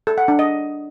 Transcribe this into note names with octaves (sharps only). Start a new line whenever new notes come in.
A4
F#5
D4
D#5